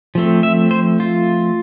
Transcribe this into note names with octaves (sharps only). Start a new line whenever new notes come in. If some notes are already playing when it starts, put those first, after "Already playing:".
F3 A3 C4
E5
C5
F4